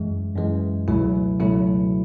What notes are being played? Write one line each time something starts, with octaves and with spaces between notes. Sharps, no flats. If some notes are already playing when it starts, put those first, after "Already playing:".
Already playing: F#2 E3 G#3
F#2 E3 G#3
C#2 B2 F#3 A3 E4
C#2 B2 F#3 A3 E4